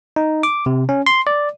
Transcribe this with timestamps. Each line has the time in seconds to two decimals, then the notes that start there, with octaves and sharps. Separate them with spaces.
0.16 D#4
0.43 D6
0.66 C3
0.89 C#4
1.06 C6
1.27 D5